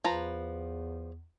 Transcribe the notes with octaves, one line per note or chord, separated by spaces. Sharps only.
E2 F3 B4 A#5